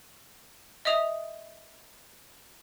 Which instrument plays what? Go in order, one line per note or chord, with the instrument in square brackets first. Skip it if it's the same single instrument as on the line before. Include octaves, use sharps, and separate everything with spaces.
[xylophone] D#5 E5 D#6 F7